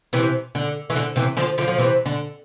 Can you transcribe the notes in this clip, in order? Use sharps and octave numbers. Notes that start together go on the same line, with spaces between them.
C3 E3
D3
E3
D3
C3 E3
D3 F3
D3 F3
F3
C3 E3
D3